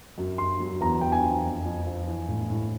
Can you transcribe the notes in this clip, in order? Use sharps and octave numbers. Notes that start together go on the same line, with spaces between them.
F#2
F#2 C6
F#3
E2 A#5
E2 G5
G#5
F3
F2
F2
F3
E3
A2
A2